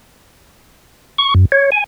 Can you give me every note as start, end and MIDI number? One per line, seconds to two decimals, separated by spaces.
1.18 1.34 85
1.35 1.45 42
1.52 1.70 73
1.72 1.84 80